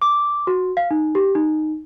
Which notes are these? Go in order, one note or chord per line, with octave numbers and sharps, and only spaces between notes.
D6
F#4
F5
D#4
G4
D#4